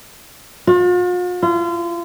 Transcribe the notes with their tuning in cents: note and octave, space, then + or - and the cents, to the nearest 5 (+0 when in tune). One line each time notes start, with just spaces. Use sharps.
F4 +45
F4 -35